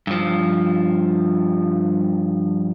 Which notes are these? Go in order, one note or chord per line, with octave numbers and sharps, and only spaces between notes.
G2 F3